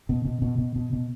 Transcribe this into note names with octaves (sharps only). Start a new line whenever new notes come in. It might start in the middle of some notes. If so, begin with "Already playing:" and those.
B2
B2
B2
B2
B2
B2